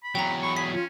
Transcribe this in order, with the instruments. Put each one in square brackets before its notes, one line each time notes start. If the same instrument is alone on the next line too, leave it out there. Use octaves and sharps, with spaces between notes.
[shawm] B5
[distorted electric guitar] E2 F#3 [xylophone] G5 A#5
[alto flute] B5 [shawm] C#6
[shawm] G#4 [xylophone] B6
[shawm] C#4 [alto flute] F4